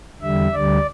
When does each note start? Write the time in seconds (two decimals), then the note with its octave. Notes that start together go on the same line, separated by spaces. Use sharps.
0.21 E2 D3 G3 E5
0.53 D2 D3 G3 D5